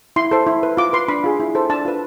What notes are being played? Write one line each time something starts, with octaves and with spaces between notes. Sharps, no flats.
E4 C6
A4 C5
E4
B4
F4 D6
B4 C6
D4 B5
F4 G#4
E4
A4 C5
D4 A5
F4 B4